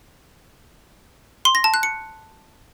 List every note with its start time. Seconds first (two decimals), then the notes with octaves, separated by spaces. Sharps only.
1.45 C6
1.55 A#6
1.64 A5
1.74 F#6
1.83 C#7